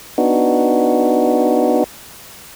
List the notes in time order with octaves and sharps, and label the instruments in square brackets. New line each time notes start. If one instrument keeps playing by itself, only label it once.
[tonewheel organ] B3 D4 D#4 F#4